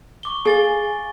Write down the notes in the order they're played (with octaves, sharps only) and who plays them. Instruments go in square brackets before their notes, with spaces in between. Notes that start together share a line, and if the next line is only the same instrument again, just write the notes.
[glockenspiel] C#6 D6 G7
[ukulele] G#4 F5 [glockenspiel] G#5 A6 G7